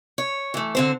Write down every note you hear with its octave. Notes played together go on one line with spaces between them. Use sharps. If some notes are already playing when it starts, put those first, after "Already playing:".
C#5
E3 A3
D3 C4 C5